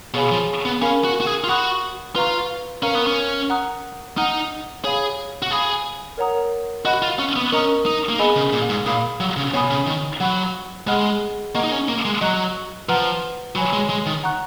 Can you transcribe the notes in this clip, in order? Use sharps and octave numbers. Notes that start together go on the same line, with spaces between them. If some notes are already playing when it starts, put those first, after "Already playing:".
B2 G#4 C#5 F5 G#5 B5
F3
B3
C#4 A#4 F5 G#5 B5
F#4
F#4
G#4
F4
F#4 F#5 B5 D#6 F#6
F4 B4 F5 A#5 C#6
C#4 A#4 F5 A#5
B3
C#4
F#5 A#5 D#6 F#6
D#4 F#5 A#5 F6
G#4 C#5 F5 B5
F#4
G#4 F5 G#5 B5 D#6
A#4 C#5 F#5 A#5 D#6
F#4 D#5 F#5 B5 F#6
F4
C#4
B3
C#4 A#4 D#5 A#5 D#6
D#4
A#3
B3 G#4 D#5 G#5 B5
C#3
A#2
G#2
A#2 F5 B5 D#6
F#3
C#3
B2 C#5 G#5 B5 D#6
C#3
D#3
F#3 F#5 B5 F#6
G#3 G#4 D#5 F#5 B5 F6
A#3 D#5 F#5 A#5 C#6
D#4
C#4
A#3
G#3
F#3 D#5 A#5 C#6 F#6
F3 B4 F#5 A#5 F6
F#3 C#5 G#5 B5
G#3
G#3
D#3
F#5 A#5 C#6 F#6